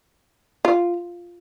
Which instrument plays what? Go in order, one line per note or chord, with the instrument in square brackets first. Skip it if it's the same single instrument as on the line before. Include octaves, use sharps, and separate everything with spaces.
[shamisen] F4